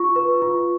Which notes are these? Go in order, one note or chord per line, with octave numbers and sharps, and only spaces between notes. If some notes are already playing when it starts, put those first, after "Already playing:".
Already playing: F4 C#6
B4
F4